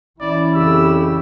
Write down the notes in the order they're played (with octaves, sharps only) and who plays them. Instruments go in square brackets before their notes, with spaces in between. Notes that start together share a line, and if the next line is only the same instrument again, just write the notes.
[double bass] E3 C#4 [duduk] E4 [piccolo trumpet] D5
[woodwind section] F2 C#3 G4 [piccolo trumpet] E6